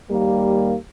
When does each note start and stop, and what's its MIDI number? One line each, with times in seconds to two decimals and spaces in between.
0.11 0.75 39
0.11 0.75 55
0.11 0.75 58